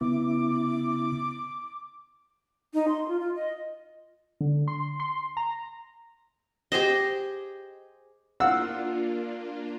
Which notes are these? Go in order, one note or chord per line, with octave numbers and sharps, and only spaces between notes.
C#3 B3 E4 D6
D#4
C6
F4
F4
D#5
D3
C6
C6
A#5
G4 G#4 C5 D#5
A#3 D4 F4 F5 F#5 E6